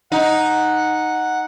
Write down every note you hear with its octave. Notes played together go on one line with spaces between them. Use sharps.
D#4 F#5